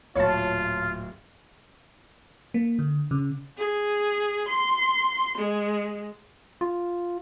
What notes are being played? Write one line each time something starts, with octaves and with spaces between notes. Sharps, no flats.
D1 A#2 F4 C#5 A5 C#7
A#3
D3
C#3
G#4
C6
G#3
F4